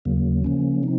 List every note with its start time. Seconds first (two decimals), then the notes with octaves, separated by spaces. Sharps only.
0.05 D#2 C#3 F#3 A#3
0.44 C#3 F3 A#3 C#4
0.83 C3 F3 C4 D#4